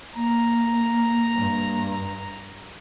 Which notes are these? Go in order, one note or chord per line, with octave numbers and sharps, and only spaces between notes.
A#3 A#5
G2